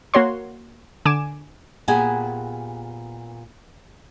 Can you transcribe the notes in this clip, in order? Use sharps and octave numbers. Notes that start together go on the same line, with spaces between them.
A#3 F#4 C#5 C6
D3 G#5 D6 E7
A#2 B3 G4 G#4 F#5 G#5